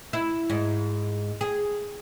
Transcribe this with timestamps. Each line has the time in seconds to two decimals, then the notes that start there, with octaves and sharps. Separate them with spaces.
0.13 E4
0.50 G#2
1.41 G#4